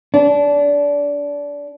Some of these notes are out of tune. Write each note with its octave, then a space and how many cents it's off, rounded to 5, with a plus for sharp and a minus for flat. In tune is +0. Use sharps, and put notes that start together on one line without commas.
D4 -25